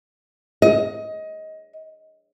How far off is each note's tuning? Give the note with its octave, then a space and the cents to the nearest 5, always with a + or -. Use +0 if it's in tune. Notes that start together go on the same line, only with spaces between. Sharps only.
D#5 +20